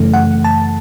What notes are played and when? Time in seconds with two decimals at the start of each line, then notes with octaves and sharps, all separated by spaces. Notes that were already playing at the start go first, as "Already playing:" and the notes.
Already playing: F#2 C#3 E3 A3
0.13 F#5
0.44 A5